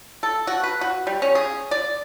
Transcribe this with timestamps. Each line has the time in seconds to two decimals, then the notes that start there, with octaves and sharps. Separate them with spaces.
0.23 A4
0.47 F#4
0.63 B4
0.81 F#4
1.07 G3
1.22 C#4
1.35 G#4
1.71 D5